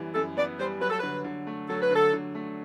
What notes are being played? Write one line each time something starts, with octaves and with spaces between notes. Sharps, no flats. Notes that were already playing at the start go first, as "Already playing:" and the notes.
Already playing: F#2 E3 G3 B3
F#2 A4
B3 D5
G3 C5
F#3 B4
A4
D3 B4
D3
A3
F#3 A4
B4
D3 A4
D3
A3